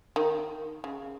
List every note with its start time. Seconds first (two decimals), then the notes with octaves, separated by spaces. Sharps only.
0.16 D#3
0.84 C#3